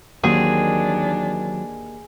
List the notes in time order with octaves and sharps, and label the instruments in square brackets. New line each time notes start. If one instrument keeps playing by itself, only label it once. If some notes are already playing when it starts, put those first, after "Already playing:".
[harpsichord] D#2 [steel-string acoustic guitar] D#3 F#3 C4 [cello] E3 D4 [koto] G#4